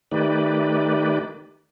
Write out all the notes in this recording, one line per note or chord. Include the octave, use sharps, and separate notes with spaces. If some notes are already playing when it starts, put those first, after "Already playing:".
D#3 A3 D#4 G4 B4 D5